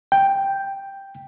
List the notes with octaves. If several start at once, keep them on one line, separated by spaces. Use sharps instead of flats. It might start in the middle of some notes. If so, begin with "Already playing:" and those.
G5